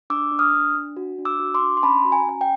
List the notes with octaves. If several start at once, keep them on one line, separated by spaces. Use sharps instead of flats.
D4 D6 E6
D4
D#6 F6
D4
D4
F#4
D4
D6 E6
F#4
C6 D6
D4
C6
C#4 A5 B5
F#4
G#5 A#5
C#4 G#5
G5